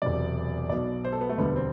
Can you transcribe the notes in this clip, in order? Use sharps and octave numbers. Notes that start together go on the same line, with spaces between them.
E1 E2 C3 F#3 D5
B1 B2 F#3 D5
C5
A4
B3
A3
E1 D2 D3 G3 B3
C4